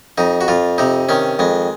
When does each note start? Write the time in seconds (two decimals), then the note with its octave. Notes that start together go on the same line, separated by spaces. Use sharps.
0.18 F2 D#4
0.41 F#4
0.48 F2 F4
0.78 C3 D#4
1.09 D#3 C#4
1.39 F2 G#3